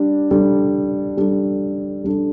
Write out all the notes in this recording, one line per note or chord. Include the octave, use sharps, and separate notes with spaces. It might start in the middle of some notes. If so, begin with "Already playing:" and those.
Already playing: G3 D4
G3 D4 A4
G3 D4 A4
G3 D4 A4